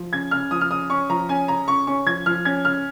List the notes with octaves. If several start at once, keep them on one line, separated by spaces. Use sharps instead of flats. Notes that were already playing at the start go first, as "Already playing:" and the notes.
Already playing: F3
C#3 G#6
C#3 F6
F3 D#6
F6
C#3 D#6
C#4 C#6
F3 A#5
C#4 G#5
C#3 A#5
C#3 C#6
C#4 C#6
F3 G#6
F3 F6
C#4 G#6
C#3 F6